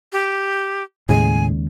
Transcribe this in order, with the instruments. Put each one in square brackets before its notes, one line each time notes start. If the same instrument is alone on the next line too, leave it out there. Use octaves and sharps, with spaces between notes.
[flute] G4
[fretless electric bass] D#2 C#3 G#3 [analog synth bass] A2 [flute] G#5